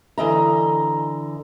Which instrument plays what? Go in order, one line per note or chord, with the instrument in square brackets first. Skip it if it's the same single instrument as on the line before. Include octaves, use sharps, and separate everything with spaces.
[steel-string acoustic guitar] D3 E3 D#5 A#5